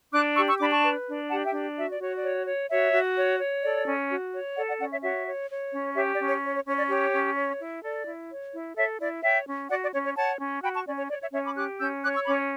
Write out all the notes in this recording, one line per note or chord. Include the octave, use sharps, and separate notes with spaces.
D4 D6 F#6
G4 C#6 E6
C#6 E6
D4 B5 D6
A5 C#6
B4
D4
G4 F#5 A5
E5 G5
D4
F#4 E5
D5
F#4 C#5
D5
C#5
C#5
F#4 C#5 E5
F#4
C#5
C#5
A4 D5
C#4
F#4
C#5
A4 D5 F#5
D5 F#5
C#4 D5 F#5
C#5 E5
F#4 C#5 E5
C#5
C#5
C#4
G4 C#5 E5
D5
C#4
C#5
C#5
C#5
C#4 C#5
D5
G4 C#5
C#4
C#5
E4
A4 D5
E4
C#5
E4
A4 C#5 E5
E4 D5
C#5 E5 G5
C#4
F#4 D5 F#5
D5
C#4 C#5
C#5
C#5 F#5 A5
C#4
F#4 G5 B5
A5 C#6
C#4 D5
C#5
C#5 D5
C#5 E5
C#4 C#5 E5
B5 D6
G4 D6 F#6
C#4 E6 G6
C#5 D6 F#6
C#6 E6
C#4 B5 D6